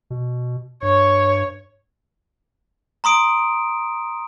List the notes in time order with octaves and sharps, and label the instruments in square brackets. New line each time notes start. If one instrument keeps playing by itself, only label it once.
[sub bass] B2
[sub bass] G2 [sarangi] C#5
[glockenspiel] A#5 C6 D#6 D7